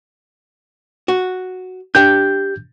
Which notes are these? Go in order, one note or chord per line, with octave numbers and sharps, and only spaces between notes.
F#4
D4 G4 G5 G6